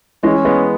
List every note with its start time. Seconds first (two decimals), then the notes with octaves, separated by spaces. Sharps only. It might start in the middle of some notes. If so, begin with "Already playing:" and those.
0.23 E3 G#3 C#4
0.45 G#3 B3